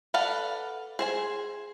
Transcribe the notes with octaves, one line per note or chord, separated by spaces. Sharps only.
A4 B4 D5 F5 F#5
G#4 C5 G#5